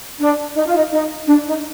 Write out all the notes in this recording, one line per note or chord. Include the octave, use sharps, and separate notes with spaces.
D4
D#4
F4
D#4
D#4
D4
D#4